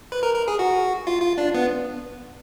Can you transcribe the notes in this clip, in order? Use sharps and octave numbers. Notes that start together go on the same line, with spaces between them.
B4
A#4
A#4
G#4
F#4
F4
F4
D4
B3